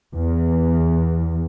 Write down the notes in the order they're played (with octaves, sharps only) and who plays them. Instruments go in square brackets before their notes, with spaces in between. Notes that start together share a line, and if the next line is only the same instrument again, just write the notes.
[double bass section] E2